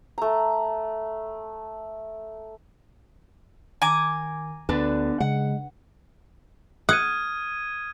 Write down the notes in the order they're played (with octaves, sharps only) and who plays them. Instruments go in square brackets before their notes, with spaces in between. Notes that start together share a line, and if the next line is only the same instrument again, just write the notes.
[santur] A3 A#5
[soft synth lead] D#3 [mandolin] G#5 A#5 D6
[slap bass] D2 [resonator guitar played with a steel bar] D3 D4 B4 [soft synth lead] B3
[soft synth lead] C#3 [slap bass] G#3 [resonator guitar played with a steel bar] F#5
[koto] F#5 [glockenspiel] D#6 [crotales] F6 G#6 D#7